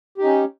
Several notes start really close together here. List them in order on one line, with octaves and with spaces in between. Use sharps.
G4 D#4 C#4